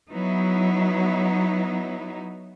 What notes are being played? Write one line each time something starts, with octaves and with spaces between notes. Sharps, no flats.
F#3 B3 D#4 E4